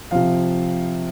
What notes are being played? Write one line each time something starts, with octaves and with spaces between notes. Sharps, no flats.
C3 F3 F5